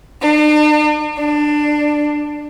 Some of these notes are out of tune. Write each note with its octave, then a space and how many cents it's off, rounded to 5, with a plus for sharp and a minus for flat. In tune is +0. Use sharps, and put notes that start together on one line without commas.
D4 +45
D4 +15